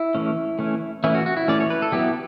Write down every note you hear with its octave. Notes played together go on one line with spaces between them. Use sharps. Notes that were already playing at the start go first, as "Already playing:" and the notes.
Already playing: E4
E3 A3 C#4
E3 A3 C#4
E3 A3 C#4 E4
F#4
F#4
E4
E3 A3 C#4 D5
C#5
B4
A4
F#3 B3 E4 G4